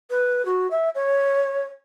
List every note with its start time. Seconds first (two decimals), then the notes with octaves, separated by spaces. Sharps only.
0.10 B4
0.45 F#4
0.71 E5
0.95 C#5